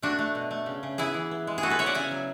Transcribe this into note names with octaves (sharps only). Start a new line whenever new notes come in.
A3 D4 F#4
A3
B2
A3
C#3
C#3
B3 E4 G#4
E3
B3
G#3
G#4
B3 F#4 A4
G#4 B4
B3 C#5 E5
D5 F#5
C#3 E5 G#5
F#3